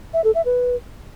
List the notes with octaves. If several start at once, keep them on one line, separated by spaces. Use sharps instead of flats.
E5
A4
E5
B4